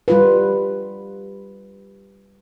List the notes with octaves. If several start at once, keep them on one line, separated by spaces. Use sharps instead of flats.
G3 F4 B4